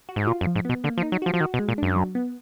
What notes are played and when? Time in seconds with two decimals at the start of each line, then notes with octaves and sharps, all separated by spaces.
0.09 F#4
0.16 G#2
0.27 A#2 F4
0.41 F#2
0.47 F3
0.56 G#2
0.65 B2 B3
0.84 D3 A#3
0.98 F3
1.02 D#4
1.12 F#3
1.22 F3 F#4
1.34 F3
1.41 D#3 F#4
1.54 B2
1.59 G#3
1.69 A#2
1.78 F#2 D4
1.96 F#3
2.15 B3